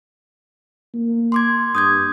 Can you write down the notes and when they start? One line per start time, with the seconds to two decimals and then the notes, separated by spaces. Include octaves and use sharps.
0.94 A#3
1.32 C6 D6 G#6
1.75 G2 D#6 G6 G#6